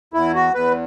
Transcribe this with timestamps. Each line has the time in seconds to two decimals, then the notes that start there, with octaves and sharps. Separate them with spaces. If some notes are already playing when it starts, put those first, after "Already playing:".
0.14 E2 E4
0.34 F#4
0.54 E2 B4